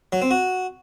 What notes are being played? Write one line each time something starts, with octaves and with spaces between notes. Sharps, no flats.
F#3
C4
F#4